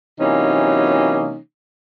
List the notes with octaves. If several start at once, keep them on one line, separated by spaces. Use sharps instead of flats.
C3 E3 F#3 A#3 C#4 D#4